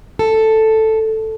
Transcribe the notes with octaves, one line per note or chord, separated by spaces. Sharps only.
A4